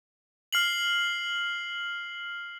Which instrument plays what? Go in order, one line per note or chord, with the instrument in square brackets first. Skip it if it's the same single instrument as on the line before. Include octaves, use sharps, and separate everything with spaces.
[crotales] F6 C7 F#7